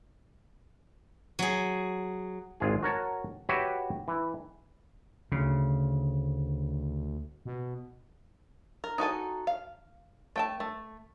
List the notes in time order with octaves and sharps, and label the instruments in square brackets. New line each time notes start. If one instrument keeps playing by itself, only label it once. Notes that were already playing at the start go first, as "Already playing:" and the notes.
[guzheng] F#3 G#4
[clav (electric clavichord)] G#1 F4 G#4
F#4 A#4 C#5 A5
F#4 G4 B4 C#5 E5
E3
[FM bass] D2 [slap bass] C#3
[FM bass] B2
[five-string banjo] A#4
D#4 F#4 A4 G#5
F5
A3 G5 A5
A3